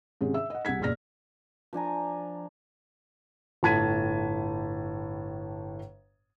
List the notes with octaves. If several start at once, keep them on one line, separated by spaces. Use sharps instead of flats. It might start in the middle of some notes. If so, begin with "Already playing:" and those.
G#2 C3 D#3 C#4
E5 E6
D#5 F#5
C2 G3 F#5 G#6 B6
F#1 E2 A#2 D5 F6 A#6
F3 D4 G#5 A#5
G1 A2 A5 G#6 B6 D#7